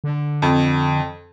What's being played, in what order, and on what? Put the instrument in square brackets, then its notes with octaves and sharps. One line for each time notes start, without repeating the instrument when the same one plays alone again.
[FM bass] D3
[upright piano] F2